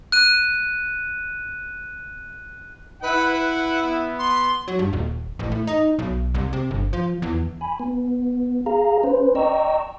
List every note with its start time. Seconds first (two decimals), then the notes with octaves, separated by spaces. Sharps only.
0.12 F#6 D#7
3.02 E4 B4 F#5
3.32 B4
3.83 B3
4.19 C6
4.68 F#3
4.79 G2
4.93 D#1
5.39 A1
5.52 A2
5.67 D#4
5.99 B1
6.34 C2
6.53 C3
6.71 G1
6.93 F3
7.22 E2
7.61 G#5 B5
7.79 B3
8.66 G#4 F5 A#5
9.03 C#4 B4 C5
9.35 D5 D#5 G5 A#5 C#6 E6